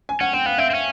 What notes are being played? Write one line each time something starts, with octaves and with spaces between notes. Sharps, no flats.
G#5
C#4 F#5
C4 G5
B3 F5
C4 E5
C4
C#4